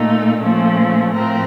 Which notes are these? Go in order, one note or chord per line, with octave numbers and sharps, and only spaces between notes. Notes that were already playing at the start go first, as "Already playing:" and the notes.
Already playing: A#2 A3 D#4
A#2 F3 A3 C#4
A2 F3 A3 C4 A#4